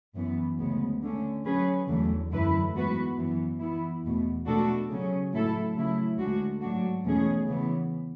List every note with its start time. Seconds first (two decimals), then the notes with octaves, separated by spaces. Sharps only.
0.16 F#2 E3 B3
0.59 D2 C#3 G#3 B3
1.02 D3 A3 C#4
1.44 F#3 C#4 G#4 B4
1.88 E2 D3 F#3 A3
2.31 F#2 D3 A3 E4 B4
2.73 G#2 E3 B3 F#4 B4
3.17 F#2 E3 B3
3.60 E3 B3 E4
4.04 E2 B2 A3
4.46 B2 A3 D4 F#4 A4
4.89 C#3 F#3 C#4
5.33 A2 F#3 A3 E4 A4
5.76 C#3 F#3 A3 E4
6.18 D2 D3 G#3 D4 F#4
6.61 G#2 F#3 A3 D4 F#4
7.04 E2 B2 A3 C#4 G#4
7.47 C#3 E3 B3